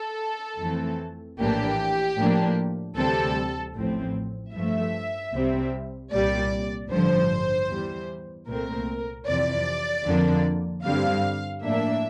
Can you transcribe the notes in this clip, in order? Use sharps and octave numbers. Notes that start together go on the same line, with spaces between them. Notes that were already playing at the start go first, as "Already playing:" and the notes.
Already playing: A4
F2 E3 A3 C4
A#1 A2 E3 A#3 D4 G4
A2 F3 A#3 D4
D2 C3 E3 G3 C4 A4
A1 A2 F3 C4
G2 F3 A3 E5
C2 C3 G3 C4
C2 A#2 G3 D5
A1 G2 D3 F3 C5
E2 E3 G3
C2 A#2 A3 C4 A#4
F2 C3 E3 D5
F2 D3 F3 A#3 D4
G2 D3 G3 C4 F5
A2 F3 A#3 D4 E5